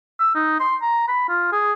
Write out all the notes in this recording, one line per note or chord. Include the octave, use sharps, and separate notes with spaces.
E6
D#4
C6
A#5
B5
F4
G#4